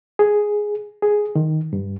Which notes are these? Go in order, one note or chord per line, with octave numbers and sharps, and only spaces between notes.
G#4
G#4
D#3
G2